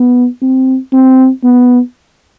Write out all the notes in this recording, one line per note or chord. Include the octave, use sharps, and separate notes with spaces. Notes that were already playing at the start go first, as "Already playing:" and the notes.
Already playing: B3
C4
C4
B3